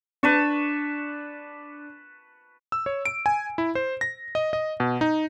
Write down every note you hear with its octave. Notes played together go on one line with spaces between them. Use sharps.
D4 B4 A5 C#6
E6
C#5
D7
G#5
E4
C5
A#6
D#5
D#5
B2
D#4